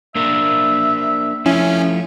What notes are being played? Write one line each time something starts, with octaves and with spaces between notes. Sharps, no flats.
A#3 D4 A#4 E5
F3 A3 C#4 E4